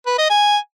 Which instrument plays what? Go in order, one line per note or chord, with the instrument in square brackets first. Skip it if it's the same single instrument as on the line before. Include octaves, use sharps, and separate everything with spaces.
[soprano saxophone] B4
D#5
G#5